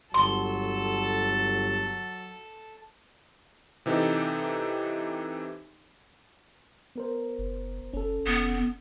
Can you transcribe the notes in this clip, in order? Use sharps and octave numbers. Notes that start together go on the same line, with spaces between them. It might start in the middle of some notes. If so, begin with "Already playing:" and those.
G1 F#3 A4 C6
C3 E3 D#4 G4 A4
B3 A#4 C5
F#1
F#1 C#4 A4
F1 B3